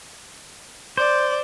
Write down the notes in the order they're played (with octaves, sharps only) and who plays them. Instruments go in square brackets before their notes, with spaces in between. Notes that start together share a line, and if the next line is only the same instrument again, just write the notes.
[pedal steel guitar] C5 [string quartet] D5